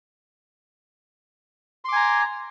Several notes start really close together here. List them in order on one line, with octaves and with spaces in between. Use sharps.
C6 D6 G#5 A#5